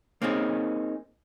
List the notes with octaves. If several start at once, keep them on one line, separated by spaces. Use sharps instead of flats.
A#3 C4 C#4 D#4 G#4